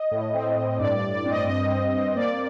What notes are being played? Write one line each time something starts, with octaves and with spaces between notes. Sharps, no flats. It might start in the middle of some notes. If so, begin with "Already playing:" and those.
Already playing: D#5
A2
C4
A2
G2 D5
D5
G2
D5
C4
D#5
G2 D#5
C4
C4
A#3 D5